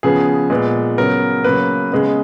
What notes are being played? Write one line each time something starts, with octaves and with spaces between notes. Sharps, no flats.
C#3 F3 B3 G#4
A#2 G#3 B3
C#3 F#3 B3 A#4
C#3 F#3 A#3 B4
C#3 G#3 B3